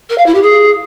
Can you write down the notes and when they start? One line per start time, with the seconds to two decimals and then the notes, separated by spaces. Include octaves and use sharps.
0.09 A#4
0.18 F5
0.26 E4
0.34 G4
0.42 G#4